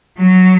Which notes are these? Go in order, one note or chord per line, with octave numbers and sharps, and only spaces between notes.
F#3